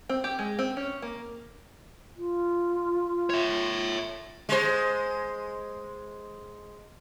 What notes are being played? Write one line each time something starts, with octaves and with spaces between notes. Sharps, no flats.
C4
G4
G#3
C4
C#4
A#3
F4
C#5 E5
G#3 C5